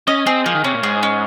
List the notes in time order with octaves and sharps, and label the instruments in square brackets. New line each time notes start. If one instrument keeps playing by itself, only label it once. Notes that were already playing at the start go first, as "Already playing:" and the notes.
[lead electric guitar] C#4 [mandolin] D#5
[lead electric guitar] C4 [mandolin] G#4
[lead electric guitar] F3 [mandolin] A#3
[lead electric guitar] D#3
[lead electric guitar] C3 [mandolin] C#4
[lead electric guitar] A#2
[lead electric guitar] G#2 [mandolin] G#4
[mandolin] C#4